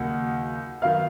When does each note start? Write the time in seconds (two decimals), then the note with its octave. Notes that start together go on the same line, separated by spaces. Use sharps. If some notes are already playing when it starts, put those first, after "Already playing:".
Already playing: D#2 C#3 F#3 A#3 D#4 F#5
0.82 D#3 F#3 B3 F5